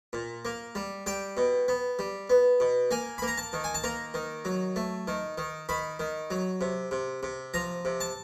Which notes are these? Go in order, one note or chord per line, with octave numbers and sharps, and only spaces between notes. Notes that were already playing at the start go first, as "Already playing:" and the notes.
A#2
A#3
G3
G3 G5
B2
B3
G3
B3
B2
A#3 G#5
A#3 B5
A#5
A5
D#3
G#5
A5
A#3 A#5
D#3
F#3
A3
D#3
D#3
D#3 B5
D#3
F#3
C3
C3
C3
F3 A#5
C3
A5